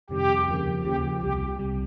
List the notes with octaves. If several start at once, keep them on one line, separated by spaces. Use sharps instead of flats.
F2 C3 D#3 G3 G4
D#2 C#3 F3 A#3
D#2 C#3 F3 A#3 G4
C2 C3 G3 G4
C2 C3 G3